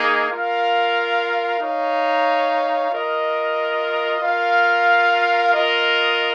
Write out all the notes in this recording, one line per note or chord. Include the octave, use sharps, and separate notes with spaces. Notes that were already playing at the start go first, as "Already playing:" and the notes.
Already playing: A#3 D#4 G#4
F4 A#4 F5
D#4 C#5 F5
F4 A#4 D#5
F4 A#4 F5
F4 A#4 D#5